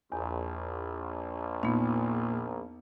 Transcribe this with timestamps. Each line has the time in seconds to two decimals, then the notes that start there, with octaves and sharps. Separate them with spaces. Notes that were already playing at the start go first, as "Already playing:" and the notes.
0.12 A#1 E2
1.63 A#2 B3 D#4